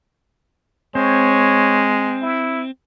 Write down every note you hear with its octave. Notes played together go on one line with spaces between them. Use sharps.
G#3 C4 C#5
E4